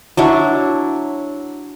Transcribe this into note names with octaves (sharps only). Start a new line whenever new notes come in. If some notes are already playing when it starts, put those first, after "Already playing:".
F#3 D4 E4